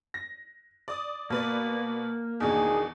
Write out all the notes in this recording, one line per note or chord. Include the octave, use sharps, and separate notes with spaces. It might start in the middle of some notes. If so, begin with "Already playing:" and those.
A#6
D5 D#6
B2 A#3 B4 D5
E2 B2 D#3 D4 G#4